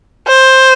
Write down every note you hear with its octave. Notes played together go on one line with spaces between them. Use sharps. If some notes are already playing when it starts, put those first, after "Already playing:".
C5